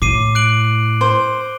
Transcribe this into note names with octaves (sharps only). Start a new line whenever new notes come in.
A2 D6 C7 D#7
F#6 D7 F#7
C5